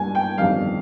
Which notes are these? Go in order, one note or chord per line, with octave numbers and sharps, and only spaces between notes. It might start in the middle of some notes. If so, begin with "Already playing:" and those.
Already playing: G2 G3 A#3 G#5
G5
G1 F2 D#3 G3 F5